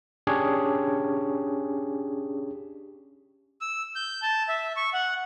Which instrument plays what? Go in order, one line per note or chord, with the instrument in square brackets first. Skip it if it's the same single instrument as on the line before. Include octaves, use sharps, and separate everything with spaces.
[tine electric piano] C#4 D4 G4 G#4 C#5
[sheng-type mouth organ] E6
G6
A5
E5
C#6
F#5